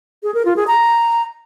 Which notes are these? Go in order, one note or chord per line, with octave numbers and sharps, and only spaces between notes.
G#4
A#4
F4
G#4
A#5